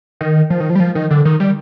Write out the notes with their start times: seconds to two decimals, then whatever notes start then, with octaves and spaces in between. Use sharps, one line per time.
0.21 D#3
0.50 F3
0.60 D#3
0.70 F3
0.75 G3
0.80 F3
0.95 D#3
1.11 D3
1.25 D#3
1.40 G3